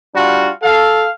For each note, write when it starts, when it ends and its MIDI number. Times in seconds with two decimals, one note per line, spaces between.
0.15 0.50 55
0.15 0.50 62
0.15 0.50 65
0.15 0.50 66
0.63 1.08 69
0.63 1.08 77